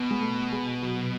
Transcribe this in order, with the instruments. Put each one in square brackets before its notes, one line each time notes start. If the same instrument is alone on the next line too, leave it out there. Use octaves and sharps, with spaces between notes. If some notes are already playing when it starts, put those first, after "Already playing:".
Already playing: [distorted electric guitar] B2
[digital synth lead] G#3
A3
G#3
F#3